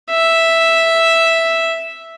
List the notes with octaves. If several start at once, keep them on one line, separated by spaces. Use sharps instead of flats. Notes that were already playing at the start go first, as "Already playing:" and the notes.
E5